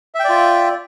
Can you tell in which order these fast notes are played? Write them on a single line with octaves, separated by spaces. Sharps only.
E5 G5 D5 F4